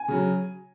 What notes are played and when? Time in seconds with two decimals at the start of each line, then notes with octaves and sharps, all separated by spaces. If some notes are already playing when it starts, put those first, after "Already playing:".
Already playing: G#5
0.08 C#3 F#3